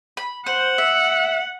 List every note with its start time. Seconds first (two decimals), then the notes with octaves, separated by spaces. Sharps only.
0.17 B5
0.46 C5 F#5
0.78 E5